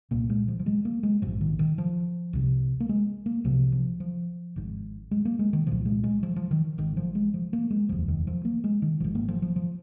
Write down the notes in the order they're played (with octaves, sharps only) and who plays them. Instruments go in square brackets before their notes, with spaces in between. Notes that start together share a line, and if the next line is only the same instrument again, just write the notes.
[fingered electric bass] C2 A#2 A#3
G#3
F3
F3
G#3
A#3
G#3
A#1 G#2 F3
D#3
D#3
F3
C2 C3
A#3
G#3
A#3
C2 C3 F3
F3
F3
G#1 G#2
G#3
A#3
G#3
D#3
C2 A#2 F3
G#3
G#3
F3
F3
D#3
G#1 G#2 D#3
F3
G#3
F3
A#3
G#3
F1 D#2 F3
D#3
F3
A#3
G#3
D#3
G#1 G#2 F3
A#3
F3
F3
F3